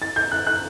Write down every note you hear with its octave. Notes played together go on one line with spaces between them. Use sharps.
A6
G6
F#6
F#6